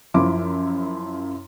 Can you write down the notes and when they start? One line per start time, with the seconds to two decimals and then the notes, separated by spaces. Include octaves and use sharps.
0.14 F#2 F3 E4 D6